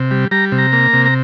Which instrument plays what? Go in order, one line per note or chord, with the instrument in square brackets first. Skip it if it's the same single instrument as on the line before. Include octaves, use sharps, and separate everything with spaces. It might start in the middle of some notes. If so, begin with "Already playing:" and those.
Already playing: [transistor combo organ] C3
G3
G3 A#5
C3
A#5
A#3
C3
A#5